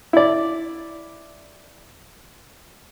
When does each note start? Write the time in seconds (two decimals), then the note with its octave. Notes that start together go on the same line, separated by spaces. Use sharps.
0.13 E4 D5